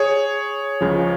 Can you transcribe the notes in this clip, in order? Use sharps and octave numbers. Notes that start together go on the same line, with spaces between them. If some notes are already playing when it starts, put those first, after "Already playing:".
Already playing: G#4 C#5
C#2 C#3 F3